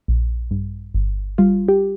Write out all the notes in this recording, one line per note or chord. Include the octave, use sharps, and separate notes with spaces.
A#1
G2
G1
G3 F4
G4